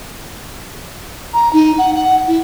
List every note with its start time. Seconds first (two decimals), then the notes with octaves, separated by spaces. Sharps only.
1.34 A#5
1.53 D#4
1.78 F#5
1.95 F#5
2.27 E4